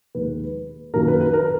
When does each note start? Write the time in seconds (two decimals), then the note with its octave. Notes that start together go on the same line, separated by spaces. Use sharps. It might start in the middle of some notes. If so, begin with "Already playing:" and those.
0.15 D#2 D#3 G#3 B4
0.94 F#2 D#3 A#3 A#4
1.08 B4
1.20 B4
1.33 A#4